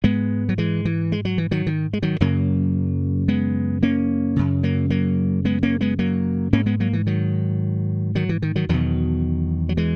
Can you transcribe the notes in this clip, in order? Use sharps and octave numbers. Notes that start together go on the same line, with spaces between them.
G#2 G#3 B3
F#3
E3 G#3
E3
G#3
F#3
E3
D#3 F#3
D#3
G#3
D#3 F#3
F#2 C#3 F#3 A#3
G#3 B3
A#3 C#4
F#2 C#3
F#3 A#3
F#3 A#3
G#3 B3
A#3 C#4
G#3 B3
F#3 A#3
G#2 A#3 C#4
G#3 B3
F#3 A#3
E3
D#3 F#3
D#3 F#3
E3
D#3
D#3 F#3
E2 B2 D#3 F#3
F#3
E3 G#3